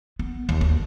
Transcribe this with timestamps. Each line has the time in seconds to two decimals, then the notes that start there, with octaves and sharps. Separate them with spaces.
0.19 B3
0.49 D#2
0.61 D2